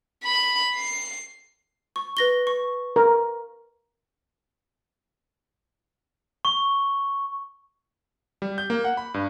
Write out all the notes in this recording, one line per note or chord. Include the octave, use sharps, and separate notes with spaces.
B5
C7
C#6
B4 A#6 G7
C#6
A#4
C#6
G3
G6
A#3
F#5
B5
G2